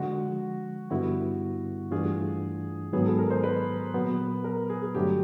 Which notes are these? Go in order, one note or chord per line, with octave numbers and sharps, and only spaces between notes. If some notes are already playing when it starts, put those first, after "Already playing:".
Already playing: D3 F3 G#3 F#4
G2 D3 G3 B3 E4 F#4
G2 E3 A3 D4 F4 G#4
G#2 D#3 F#3 B3 G#4
A4
A#4
C5
B4
A#2 F#3 B3
A#4
G#4
G#4
G2 D3 F#3 A3 G4